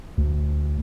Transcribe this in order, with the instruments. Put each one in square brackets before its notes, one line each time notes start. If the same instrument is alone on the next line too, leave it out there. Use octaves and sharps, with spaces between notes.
[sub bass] D2